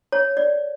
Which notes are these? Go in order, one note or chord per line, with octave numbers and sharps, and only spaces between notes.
C#5
D5